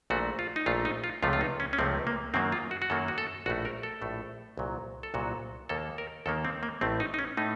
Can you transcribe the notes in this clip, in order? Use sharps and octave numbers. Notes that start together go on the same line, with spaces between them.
A#1 A#2 A3 F#4
F4
D#4
A#1 A#2 A3 F4
D#4
F4
C#2 C3 F3 A3 F4
F4
D#4
C#4
C#4
C#2 C3 F3 A3 C4
A#3
F#2 D#3 F#3 A#3 C4
F4
F#4
F#4
F#2 D#3 F#3 A#3 A4
F#4
A4
A#1 A2 A3 F#4
A#4
A4
A#1 A2 A3
C2 A#2 F#3
A4
C2 A#2 F#3 F#4
D#2 D#3 A#3 A4
A#4
D#2 D#3 A#3 A4
C4
A#3
A1 A2 A3 C4
D#4
D#4
C#4
A2 A3 D#4